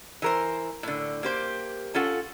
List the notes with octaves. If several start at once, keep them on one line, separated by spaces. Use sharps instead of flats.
E3 A#4 C5
A2 D3
A#3 G4 C5
C#4 F4 A4 F#5